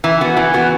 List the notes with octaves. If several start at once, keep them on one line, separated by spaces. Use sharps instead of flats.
E3
B3 F#4
E3
B3 F#4